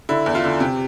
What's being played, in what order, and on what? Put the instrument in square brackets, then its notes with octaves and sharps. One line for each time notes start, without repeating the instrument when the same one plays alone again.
[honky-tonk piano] D3 E4
E2
F4
D3
C3 G4